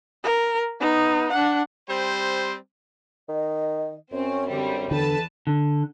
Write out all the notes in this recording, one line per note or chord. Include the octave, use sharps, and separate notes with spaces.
A#4
B3 D#4
D4 F#5
G3 C4 C5
D#3 D#5
F#2 C4 C#4
D3 G3 C4 G4
E2 D3 A4 B4 A5
D3